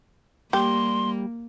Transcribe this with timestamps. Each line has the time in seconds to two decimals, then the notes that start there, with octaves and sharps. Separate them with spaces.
0.53 G3 A#3 G4 C6